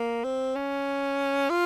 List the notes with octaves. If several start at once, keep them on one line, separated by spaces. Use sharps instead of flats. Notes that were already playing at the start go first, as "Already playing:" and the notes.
Already playing: A#3
C4
C#4
F4